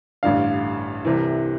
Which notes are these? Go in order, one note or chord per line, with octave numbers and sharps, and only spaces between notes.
A1 G2 D3 F5
C2 C3 E3